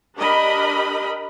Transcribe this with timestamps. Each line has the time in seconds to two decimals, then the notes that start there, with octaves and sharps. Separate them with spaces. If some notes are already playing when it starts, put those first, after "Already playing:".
0.18 D4 G4 A#4 D#5 B5